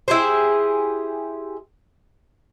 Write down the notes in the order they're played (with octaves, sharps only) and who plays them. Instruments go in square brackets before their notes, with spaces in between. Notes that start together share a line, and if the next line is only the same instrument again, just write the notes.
[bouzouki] E4 G4 G#4 C5